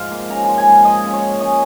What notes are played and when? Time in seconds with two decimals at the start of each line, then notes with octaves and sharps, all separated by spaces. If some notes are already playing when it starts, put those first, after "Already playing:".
Already playing: G#2 F3 F5
0.11 A#3
0.30 C#4 A#5
0.43 F3 A#5
0.57 G#5
0.67 G#2
0.84 F3 D#5
1.04 C#3
1.13 C#5
1.23 A#3
1.40 C#4 D#5